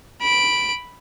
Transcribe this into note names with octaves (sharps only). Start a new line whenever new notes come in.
B5 D7